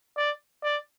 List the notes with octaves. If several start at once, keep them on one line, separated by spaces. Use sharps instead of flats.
D5
D5